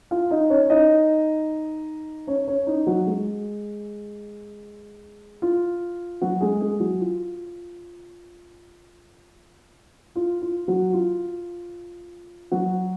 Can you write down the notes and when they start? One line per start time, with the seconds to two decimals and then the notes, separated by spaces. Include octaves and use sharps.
0.11 F4 F5
0.31 D#4 D#5
0.50 C#4 C#5
0.70 D#4 D#5
2.27 C#4 C#5
2.47 C#4 C#5
2.67 D#4
2.87 F#3 F#4
3.07 G#3 G#4
5.42 F4
6.21 F#3 F#4
6.41 G#3 G#4
6.61 G#3 G#4
6.80 F#3 F#4
7.00 F4
10.16 F4
10.42 F4
10.68 F#3 F#4
10.93 F4
12.51 F#3 F#4